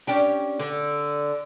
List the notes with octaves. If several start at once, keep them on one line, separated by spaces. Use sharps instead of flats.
C#4 D4 G4
D3